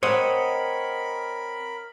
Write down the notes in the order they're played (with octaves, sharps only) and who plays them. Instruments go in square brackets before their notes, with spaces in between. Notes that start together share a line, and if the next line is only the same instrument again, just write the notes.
[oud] C4 [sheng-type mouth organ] A#4 B5 [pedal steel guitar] C#5 D#5 F#5